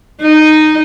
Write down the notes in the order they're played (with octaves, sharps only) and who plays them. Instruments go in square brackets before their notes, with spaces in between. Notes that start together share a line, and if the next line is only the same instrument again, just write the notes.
[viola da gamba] D#4